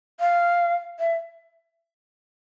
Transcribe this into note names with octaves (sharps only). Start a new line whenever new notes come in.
F5
E5